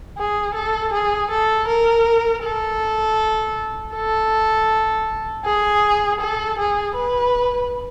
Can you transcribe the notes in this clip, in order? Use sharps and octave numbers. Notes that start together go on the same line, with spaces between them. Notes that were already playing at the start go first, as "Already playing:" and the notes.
G#4
A4
G#4
A4
A#4
A4
A4
G#4
A4
G#4
B4